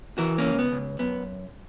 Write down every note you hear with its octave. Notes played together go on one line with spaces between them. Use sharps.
E3 F#4 A#4
A#3 C#4
C#2
B3
C#2
F#2 B3